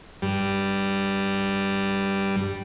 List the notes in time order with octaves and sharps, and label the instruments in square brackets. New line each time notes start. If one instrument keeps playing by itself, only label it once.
[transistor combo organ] G2 G3